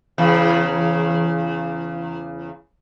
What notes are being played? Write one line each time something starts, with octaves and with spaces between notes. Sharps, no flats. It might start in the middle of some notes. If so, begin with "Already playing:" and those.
E2 C#3